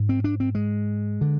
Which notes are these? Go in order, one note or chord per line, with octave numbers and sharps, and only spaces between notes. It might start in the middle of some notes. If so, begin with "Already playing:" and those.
Already playing: G#2
C4
D4
C4
G#3
D3